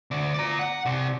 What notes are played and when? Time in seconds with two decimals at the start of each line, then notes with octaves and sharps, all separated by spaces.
0.11 D2 D5
0.34 D5 A#5
0.59 F#5
0.85 C3 D5